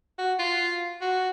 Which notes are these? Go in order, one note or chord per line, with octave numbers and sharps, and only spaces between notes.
F#4
F4
F#4